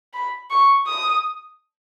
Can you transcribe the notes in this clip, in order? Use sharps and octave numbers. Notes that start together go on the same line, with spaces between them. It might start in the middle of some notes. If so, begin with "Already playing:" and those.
B5
C#6
D#6